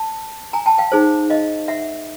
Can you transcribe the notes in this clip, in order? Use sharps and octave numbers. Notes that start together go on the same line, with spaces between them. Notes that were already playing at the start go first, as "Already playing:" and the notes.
Already playing: A5
G#5 A#5
G5 A5
F5 G5
D#4 G#4 C5
D#5 F5
E5 F#5